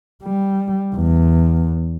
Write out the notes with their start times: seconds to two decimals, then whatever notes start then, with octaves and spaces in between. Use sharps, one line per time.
0.24 G3
0.95 E2